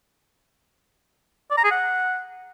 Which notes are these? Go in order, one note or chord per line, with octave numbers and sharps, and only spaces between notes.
D5
A#5
G#4
F#5